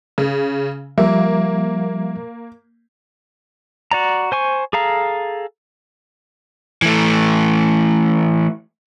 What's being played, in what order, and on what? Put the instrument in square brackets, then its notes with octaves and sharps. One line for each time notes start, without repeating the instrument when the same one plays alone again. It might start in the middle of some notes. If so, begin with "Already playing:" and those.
[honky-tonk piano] C#3
[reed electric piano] F3 G3 E5 [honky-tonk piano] A#3
[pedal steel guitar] F#4 D5 A#5
C5 G#5 C#6
G#4 A4 F5 A#5
[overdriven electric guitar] E3 A3